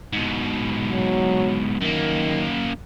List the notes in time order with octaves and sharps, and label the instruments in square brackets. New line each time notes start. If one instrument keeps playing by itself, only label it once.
[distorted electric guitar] G#2 B2
[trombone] F#3
[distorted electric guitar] F#2 A#3 [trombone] D#3